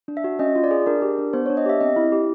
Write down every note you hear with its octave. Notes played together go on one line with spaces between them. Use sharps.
D4
E5
F#4
C#4 D#5
F4
D5
G#4
D4 A#4
G4
D4
B3 C5
D4 C#5
D#5
G4 E5
C4 D#5
E4
G4